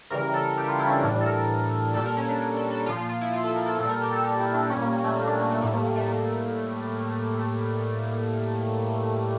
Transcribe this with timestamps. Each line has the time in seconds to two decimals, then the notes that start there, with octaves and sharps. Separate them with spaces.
0.10 C#3 E3 G3 A#4
0.34 A4
0.57 G4
0.68 F4
0.79 E4
0.87 C#4
0.91 D4
1.03 A2 E3 G3 D4
1.20 A4
1.26 A#4
1.94 A#2 G3 A4
2.06 A#4
2.17 C#4
2.29 D4
2.56 A4
2.71 A4
2.86 A#2 F3 F4
2.98 F4
3.09 F4
3.21 E4
3.33 F4
3.44 A4
3.56 A#4
3.66 A4
3.78 A#2 G3 A4
3.89 A#4
4.02 G4
4.13 A4
4.24 G4
4.39 E4
4.54 D4
4.70 A#2 G3 C#4
4.82 A#3
4.92 A#3
5.04 A3
5.16 A#3
5.27 D4
5.40 A#3
5.50 A3
5.62 A2 G3 A3
5.73 A#3
5.85 A#3
5.96 A3
6.08 A#3